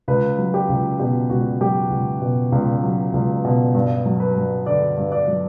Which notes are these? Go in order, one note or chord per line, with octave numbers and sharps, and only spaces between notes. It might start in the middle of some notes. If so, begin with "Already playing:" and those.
C#2 B4
F#3
G4
C#2
B2 G4
C#2 F#4
F#3 G4
C#2
B2
C#2
F#3
C#2
B2
G2
F#3
B4
G2
D3 D5
G2
D5
F#3